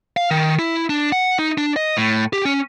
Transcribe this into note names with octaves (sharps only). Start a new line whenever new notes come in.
F5
D#3
E4
D4
F#5
D#4
D4
D#5
A2
G4
C#4